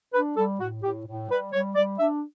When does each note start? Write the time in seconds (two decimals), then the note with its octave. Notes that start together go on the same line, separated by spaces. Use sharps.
0.14 D4 B4
0.37 G3 A4
0.60 A2 F#4
0.83 A2 G4
1.06 A2
1.29 G3 B4
1.53 G3 C#5
1.75 G3 D5
1.99 D4 E5